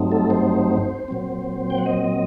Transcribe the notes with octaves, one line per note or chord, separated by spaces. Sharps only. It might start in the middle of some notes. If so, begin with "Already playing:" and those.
Already playing: G2 F#3 A3 C4 D#4
A4
C5
A#2 F#3 C4
G5
F#5
D#5